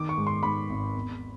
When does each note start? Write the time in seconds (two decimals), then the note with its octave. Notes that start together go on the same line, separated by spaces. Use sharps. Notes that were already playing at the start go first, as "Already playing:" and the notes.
Already playing: D#3 D6
0.09 C#6
0.18 G#2
0.27 C6
0.43 G#2 B5
0.70 G#1
0.95 E2